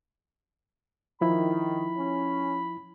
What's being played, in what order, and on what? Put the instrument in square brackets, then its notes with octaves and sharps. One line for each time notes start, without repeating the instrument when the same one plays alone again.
[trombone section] D#3 [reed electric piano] F3 E4 [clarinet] B5
[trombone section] C#4